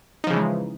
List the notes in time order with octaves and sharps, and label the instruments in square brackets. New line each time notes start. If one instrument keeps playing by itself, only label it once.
[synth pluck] D#4
F3
C#3
E3
G#3